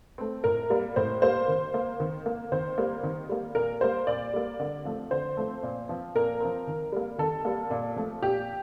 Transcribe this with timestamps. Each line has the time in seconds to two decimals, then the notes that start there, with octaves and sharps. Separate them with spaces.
0.18 A3 C4
0.44 A2 A#4
0.70 G3 A#3
0.96 A2 C5
1.22 G3 A#3 C5
1.48 D#3
1.74 A#3
2.00 D#3
2.26 A#3
2.52 D#3 C5
2.78 G3 A#3
3.03 D#3
3.29 G3 A#3
3.55 A#2 A#4
3.81 G3 A#3 C5
4.07 A#2 D5
4.33 G3 A#3
4.60 D3
4.85 F3 A3 C4
5.11 D3 C5
5.37 F3 A3 C4
5.63 A#2
5.89 F3 C4
6.15 A#2 A#4
6.40 F3 C4
6.67 D#3
6.92 G3 A#3
7.18 D#3 A4
7.45 G3 A#3
7.71 A#2
7.96 F3 A3
8.22 A#2 G4